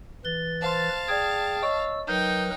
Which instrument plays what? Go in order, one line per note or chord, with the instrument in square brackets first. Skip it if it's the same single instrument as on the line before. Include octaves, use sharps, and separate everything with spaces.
[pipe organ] E3 B4 A6 [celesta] G7
[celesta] C5 C6 [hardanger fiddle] F5 A5
[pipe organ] G#4 G5 D#6 [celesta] D5 G#6
[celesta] C#5 D#5 C#6 [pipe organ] E6
[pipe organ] F#3 A#4 B4 [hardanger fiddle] D#4 G5 [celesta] G6